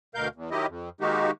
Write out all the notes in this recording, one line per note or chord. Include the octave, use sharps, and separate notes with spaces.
D2 B2 A#4 F5 G6
E2
D#3 F#3 E4 G4 D#5
F2
D#3 G#3 A#3 D#4 F#4 G4